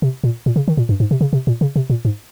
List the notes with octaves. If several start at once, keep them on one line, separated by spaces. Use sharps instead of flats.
C3
A#2
A#2
C#3
D#3
A#2
G2
G#2
C3
C#3
C3
A#2
C#3
C3
A#2
G#2